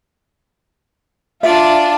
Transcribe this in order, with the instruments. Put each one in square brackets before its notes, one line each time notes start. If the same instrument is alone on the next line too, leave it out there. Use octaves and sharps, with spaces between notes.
[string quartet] D4 D5 [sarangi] F4 [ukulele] E5